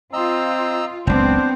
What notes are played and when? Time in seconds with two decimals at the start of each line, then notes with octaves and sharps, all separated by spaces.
0.13 C4 F4 D#5 A#5 E6
1.07 F#1 C#2 B3 C4 D4 C5